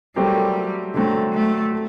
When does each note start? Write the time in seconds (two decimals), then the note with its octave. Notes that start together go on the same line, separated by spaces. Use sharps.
0.16 F#3 G3 A3 C4 G4 A#4
0.94 D3 F#3 A3 C4
1.33 A3
1.72 A4